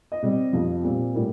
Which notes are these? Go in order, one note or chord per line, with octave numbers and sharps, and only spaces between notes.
D#5
C3 G3 C4
F2 C3 F3
A#2 G3 C4
A2 G3 A#3